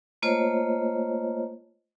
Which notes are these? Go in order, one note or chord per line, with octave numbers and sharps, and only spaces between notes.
A3 A#3 F4 C5 C#5 D#5